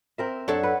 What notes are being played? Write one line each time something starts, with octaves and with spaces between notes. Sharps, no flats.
C4 A#4 E5
F#2 D4 A4 C#5 F#5
B4